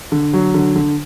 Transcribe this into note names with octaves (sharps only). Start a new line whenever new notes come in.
D3
F#3
D3
D3